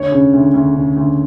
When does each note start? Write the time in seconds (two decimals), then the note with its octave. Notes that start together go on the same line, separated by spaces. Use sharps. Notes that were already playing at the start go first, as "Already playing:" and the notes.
Already playing: D2 C#5
0.12 C#3
0.33 D2
0.54 D2
0.75 C#3
0.96 D2